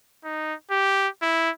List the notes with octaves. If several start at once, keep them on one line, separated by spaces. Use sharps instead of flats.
D#4
G4
E4